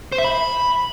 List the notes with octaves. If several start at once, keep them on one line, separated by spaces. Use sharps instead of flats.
C5
E5
B5